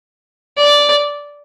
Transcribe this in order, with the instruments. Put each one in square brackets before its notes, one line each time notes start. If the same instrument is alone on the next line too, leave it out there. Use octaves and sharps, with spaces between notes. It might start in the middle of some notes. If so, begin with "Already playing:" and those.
[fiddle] D5